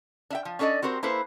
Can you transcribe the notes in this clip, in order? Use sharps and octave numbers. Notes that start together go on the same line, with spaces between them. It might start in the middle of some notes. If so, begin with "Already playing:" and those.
D4 E5 G5
F3
C#4 D4 A4 D5 D#5
C4 F#4 G4 A#4 C5
A#3 E4 A4 B4 C5